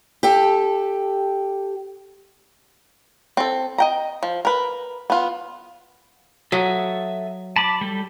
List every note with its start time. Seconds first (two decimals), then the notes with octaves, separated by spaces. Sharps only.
0.23 G4 A4
3.37 C4 A4
3.78 D#5 G5 A#5
4.23 F3
4.45 A#4 B4
5.10 B3 F4
6.52 F#3 A4 E5 D#6
7.56 A5 B5 D6
7.81 G3 A4